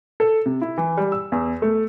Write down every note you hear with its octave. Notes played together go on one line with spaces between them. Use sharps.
A4
C3
E4
E3
G3
E6
E2
A3